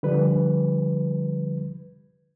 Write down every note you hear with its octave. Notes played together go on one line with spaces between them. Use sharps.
D3 F3 G3 B4